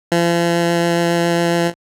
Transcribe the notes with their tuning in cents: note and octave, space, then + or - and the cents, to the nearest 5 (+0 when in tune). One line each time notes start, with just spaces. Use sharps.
F3 -40